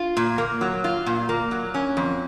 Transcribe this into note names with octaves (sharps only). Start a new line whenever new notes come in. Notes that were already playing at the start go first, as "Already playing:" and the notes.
Already playing: F4
A#2
A#3
F#3
F4
A#2
A#3
F#3
C#4
F2